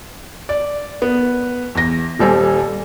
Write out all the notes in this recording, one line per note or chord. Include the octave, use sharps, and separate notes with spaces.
D5
B3
E2 A#6
D#1 G3 A4 C5 G#5